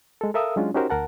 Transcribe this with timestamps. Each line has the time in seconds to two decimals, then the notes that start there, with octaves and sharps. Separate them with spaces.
0.21 G#3 A4
0.34 A4 A#4 E5 F5 D#6 E6
0.56 F#3 G#3 C#4 D4 F4
0.75 C#4 D#4 F#4 G4 A#4 C5
0.90 D2 A#4 F#5 A5